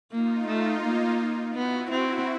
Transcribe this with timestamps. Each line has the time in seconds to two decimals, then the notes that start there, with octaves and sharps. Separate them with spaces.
0.11 A#3 D#4 F4
0.47 A3
0.83 A#3
1.55 B3 E4 F#4
1.91 C4